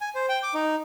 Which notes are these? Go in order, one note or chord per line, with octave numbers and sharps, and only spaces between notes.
G#5
C5
G5
D6
D#4